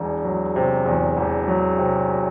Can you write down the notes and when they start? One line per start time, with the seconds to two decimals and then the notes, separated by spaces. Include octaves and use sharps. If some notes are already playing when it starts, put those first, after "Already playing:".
Already playing: E1 E2
0.25 F#3
0.56 C3
0.86 E2
1.17 E1
1.48 F#3
1.79 C3